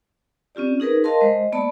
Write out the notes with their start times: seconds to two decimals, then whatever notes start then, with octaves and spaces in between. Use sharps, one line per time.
0.55 C4 C#4 F4 G4 D5
0.80 D#4 G#4 A#4 B4
1.04 A#4 D#5 F5 A5 C6
1.21 G#3 C5 D#5
1.52 A#3 B3 D5 A5 B5